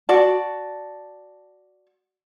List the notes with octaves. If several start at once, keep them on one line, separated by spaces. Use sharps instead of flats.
F#4 D5 A5